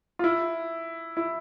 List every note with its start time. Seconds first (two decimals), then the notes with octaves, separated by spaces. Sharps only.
0.19 F4
0.24 E4
1.17 E4